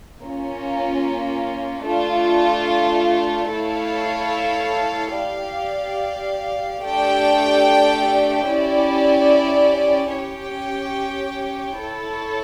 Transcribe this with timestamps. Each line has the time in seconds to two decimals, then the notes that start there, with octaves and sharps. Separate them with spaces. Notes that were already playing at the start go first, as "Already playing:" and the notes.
0.21 A#3 C#4 F4
1.86 A3 D4 F4
3.52 A3 E4 A4 C#5 F5
5.17 G4 D5 F5
6.82 A3 D4 G4 D5 G5
8.48 C#4 E4 G4 D5
10.14 C#4 G4 C#5 G5
11.79 E4 A4 C#5